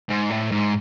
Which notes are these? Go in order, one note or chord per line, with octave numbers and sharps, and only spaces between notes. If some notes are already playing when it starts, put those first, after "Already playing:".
G#2
A2
G#2